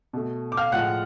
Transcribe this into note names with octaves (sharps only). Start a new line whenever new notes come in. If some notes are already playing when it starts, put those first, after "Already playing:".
B2 A3
D6
F5 F6
A2 F3 G#3 F#5 F#6